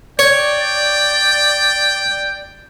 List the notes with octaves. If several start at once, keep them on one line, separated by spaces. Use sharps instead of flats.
C#5 D5 G5